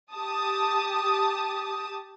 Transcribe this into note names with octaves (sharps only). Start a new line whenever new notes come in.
G4 A5 D#6